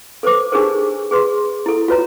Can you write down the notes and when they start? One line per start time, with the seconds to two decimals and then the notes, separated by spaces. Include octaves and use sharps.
0.23 A4 B4 C5 D6
0.52 D4 D#4 G4 G#4 A#4 C5
1.11 G#4 B4 C6
1.66 E4 A4
1.88 F4 F#4 B4 C#5 A#5